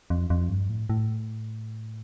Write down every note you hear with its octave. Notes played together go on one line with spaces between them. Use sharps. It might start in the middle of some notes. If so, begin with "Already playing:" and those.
F2
F2
G2
A2
A2